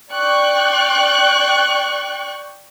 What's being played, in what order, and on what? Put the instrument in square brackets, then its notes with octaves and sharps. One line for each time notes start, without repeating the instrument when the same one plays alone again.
[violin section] D5 G5 C#6 F#6